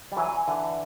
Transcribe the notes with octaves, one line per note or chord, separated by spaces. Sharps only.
G3
E3 F#3 G#5
D3 E3